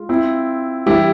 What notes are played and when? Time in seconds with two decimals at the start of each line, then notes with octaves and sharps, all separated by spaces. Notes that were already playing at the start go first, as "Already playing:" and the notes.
Already playing: G#3 F4
0.09 C4 E4
0.86 G2 E3 G3 E4 G4